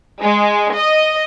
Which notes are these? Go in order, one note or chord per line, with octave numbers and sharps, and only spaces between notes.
G#3
D#5